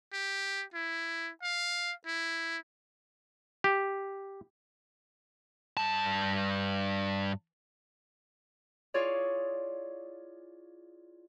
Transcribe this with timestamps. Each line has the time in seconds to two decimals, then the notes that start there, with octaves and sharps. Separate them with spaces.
0.13 G4
0.74 E4
1.43 F5
2.06 E4
3.64 G4
5.77 G2 A5
8.94 E4 F4 G#4 C#5 D5